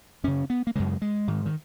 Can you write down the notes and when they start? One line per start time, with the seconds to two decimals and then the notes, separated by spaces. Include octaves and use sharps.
0.24 F#2 C#3 C#4
0.50 B3
0.67 A#3
0.75 F#2 C#3 G#3
1.02 G#3
1.28 G#2 D#3
1.46 D#3